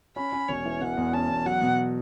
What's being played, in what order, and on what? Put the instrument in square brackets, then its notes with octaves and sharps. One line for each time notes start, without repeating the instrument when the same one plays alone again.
[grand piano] C#4 [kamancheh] B5
[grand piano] C#4
[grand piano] E1 [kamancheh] C#5
[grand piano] E3
[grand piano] E1 [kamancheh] F#5
[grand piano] E2
[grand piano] C#4 [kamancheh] A5
[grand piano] E2
[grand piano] F#3 [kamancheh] F#5
[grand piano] B2